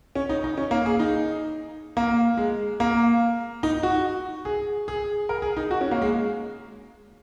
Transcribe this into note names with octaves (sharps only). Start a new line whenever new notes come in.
C#4
D#4
D#4
C#4
A#3
G#4
D#4
A#3
G#3
A#3
D#4
F#4
G#4
G#4
A#4
G#4
D#4
F#4
C#4
A#3
G#3